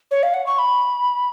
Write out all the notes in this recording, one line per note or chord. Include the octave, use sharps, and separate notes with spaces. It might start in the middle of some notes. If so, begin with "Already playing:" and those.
C#5
F5
F#5
C#6
B5